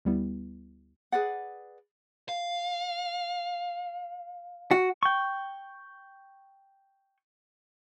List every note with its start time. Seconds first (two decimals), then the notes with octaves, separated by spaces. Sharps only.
0.05 D2 G3 B3 E4
1.12 G#4 B4 D5 F#5
2.29 F5
4.71 F#4
5.03 G5 C#6